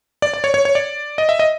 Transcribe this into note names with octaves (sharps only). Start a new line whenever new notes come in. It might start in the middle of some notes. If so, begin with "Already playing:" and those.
D5
D5
C#5
C#5
C#5
D5
D#5
E5
D#5